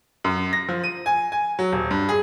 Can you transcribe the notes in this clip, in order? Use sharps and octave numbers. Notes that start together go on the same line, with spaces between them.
F#2
A#6
F3
D#7
G#5
G#5
F#3
D#1
G2
G#4